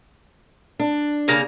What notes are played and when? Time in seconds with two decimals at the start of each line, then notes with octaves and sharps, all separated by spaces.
0.79 D4
1.28 C#3 A#3